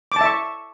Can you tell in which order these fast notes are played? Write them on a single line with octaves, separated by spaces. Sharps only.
D6 A5 E5 C#6